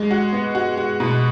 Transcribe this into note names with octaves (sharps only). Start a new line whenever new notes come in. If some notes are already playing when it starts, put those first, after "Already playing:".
Already playing: G#3
F#4
B3
F#4
F#4
B2